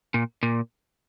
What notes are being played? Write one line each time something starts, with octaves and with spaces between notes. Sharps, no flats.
A#2
A#2